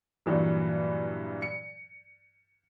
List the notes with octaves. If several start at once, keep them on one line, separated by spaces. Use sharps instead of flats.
G2 A#2 E3 F#3
C#7